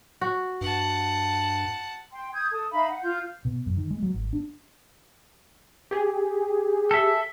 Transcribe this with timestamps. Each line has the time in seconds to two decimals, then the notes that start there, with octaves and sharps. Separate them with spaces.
0.21 F#4
0.61 G2 F#5 A5
2.12 G5 C6
2.33 D#6 G6 G#6
2.52 A4 D#6
2.71 D#4 E5 F5 B5
2.87 F#5
3.01 F4 G6
3.45 B2
3.66 F#2
3.77 D#3
3.91 G#3
4.02 F#3
4.14 G#1
4.33 D4
5.91 G4 G#4
6.91 A4 E5